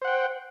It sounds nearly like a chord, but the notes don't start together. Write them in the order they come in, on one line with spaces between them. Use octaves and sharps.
C5 F#5 G5